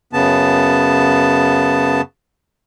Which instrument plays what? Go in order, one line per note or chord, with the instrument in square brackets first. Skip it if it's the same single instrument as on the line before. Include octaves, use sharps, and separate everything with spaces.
[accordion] F#2 C#3 B3 A5